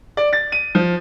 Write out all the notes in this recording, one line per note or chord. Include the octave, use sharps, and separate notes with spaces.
D5
A6
D#7
F3